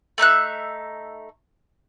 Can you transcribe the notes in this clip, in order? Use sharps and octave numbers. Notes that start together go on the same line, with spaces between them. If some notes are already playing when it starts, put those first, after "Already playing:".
A3 D#4 E5 F#6